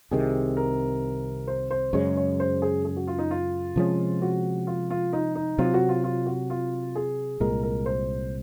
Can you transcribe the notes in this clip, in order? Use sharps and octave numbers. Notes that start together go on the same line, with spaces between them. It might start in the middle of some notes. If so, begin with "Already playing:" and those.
C2 C3 D#3 G#4
A#4
C5
C5
F#2 C#3 G#3 C#5
C#5
C5
G#4
G#4
F#4
F4
D#4
F4
C3 F3 G#3 C#4
F#4
F4
F4
D#4
D#4
C3 F#3 C4 F4
F#4
F4
F4
F#4
F4
G#4
C2 A#2 G#3 A#4
A#4
C5